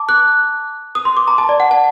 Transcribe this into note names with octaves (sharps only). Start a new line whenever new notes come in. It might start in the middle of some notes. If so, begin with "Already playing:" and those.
Already playing: A5 D6
F#6
D#6
C6
D6
A#5
A5
D5
F#5
A5